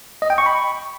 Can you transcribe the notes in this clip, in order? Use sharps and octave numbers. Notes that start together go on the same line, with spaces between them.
D#5
G5
C#6
B5